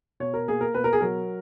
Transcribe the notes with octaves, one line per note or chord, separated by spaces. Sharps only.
B2 C#5
A#4
A#3 G#4
A#4
B2 B4
A#4
G#4
F#3 A#4